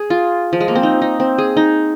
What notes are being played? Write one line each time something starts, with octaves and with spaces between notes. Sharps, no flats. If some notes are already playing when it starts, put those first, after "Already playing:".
Already playing: G#4
F4
F3
G#3
A#3
C4
D#4
D#4
C4
G#4
D#4